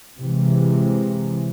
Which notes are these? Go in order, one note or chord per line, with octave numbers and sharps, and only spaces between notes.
C3 E3 G#3